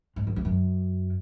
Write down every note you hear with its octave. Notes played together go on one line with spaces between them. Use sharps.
G#2
F#2
E2
F#2